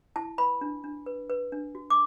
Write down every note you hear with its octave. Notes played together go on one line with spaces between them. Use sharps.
E4 A5
B4 B5
D4
D4
B4
B4
D4
F#4
D6